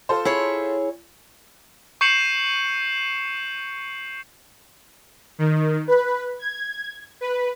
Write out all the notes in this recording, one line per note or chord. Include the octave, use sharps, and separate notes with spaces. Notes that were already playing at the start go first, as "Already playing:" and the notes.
F4 A4 C5
E4 G#4 C#5
C#6 G6 C7 C#7 E7 F#7
D#3
B4
G#6
B4